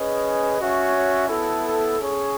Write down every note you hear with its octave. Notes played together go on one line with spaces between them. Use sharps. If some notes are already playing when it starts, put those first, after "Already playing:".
Already playing: C#4 G#4 B4 D#5
C#4 F#4 C#5 E5
B3 E4 A4
C#4 G#4 C#5